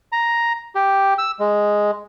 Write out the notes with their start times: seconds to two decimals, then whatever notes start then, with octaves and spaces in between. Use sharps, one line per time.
0.12 A#5
0.75 G4
1.18 E6
1.39 G#3